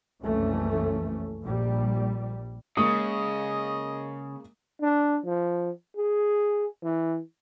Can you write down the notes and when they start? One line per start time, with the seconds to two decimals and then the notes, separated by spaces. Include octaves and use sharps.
0.21 F#1 C2 F2 E3 A3 C#4
1.44 A#1 G3
2.77 C#3 G#3 A#3 D#5 C#6 D#6
4.81 D4
5.25 F3
5.97 G#4
6.83 E3